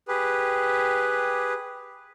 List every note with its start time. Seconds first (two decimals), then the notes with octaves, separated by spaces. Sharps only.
0.08 G4 G#4 B4